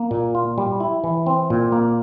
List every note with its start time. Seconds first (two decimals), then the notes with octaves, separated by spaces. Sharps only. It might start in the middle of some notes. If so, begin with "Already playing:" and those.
Already playing: A#3
0.11 A#2
0.35 F4
0.58 G3
0.80 E4
1.04 E3
1.26 C4
1.50 A#2
1.72 A#3